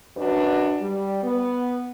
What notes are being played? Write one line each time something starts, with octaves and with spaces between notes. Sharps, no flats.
F#2 D4 F#4 B4
G3
B3